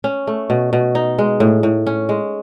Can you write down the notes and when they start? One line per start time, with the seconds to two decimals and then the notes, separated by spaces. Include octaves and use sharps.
0.04 C#4
0.27 A3
0.50 B2
0.73 B2
0.95 D#4
1.18 G#3
1.40 A2
1.63 A2
1.87 C#4
2.09 G#3